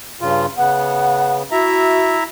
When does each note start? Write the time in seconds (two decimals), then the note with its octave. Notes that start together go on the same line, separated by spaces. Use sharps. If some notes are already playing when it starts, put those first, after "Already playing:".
0.21 G2 C#3 F4
0.57 C#3 B3 F#5
1.51 E4 F#4 E5 A#5